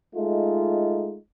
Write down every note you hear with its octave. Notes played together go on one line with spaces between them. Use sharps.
G#3 A3 D#4 F4